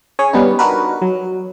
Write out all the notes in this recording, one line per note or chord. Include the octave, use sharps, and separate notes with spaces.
C#4 G#4 C#5 G#5
G3 B3 C#4 D#4
D4 D#4 F#4 A#4 B4
F#3